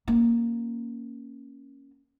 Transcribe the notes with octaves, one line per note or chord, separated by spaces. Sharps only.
A#3 C#4